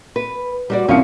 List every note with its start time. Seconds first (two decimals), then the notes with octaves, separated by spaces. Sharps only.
0.16 B4
0.70 G3 F#4 D5
0.88 C2 F3 C#4 F4 F5 C#7